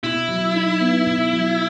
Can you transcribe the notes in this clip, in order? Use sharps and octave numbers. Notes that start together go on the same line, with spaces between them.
B2 E4
F#3
D#4
B3
B2
F#3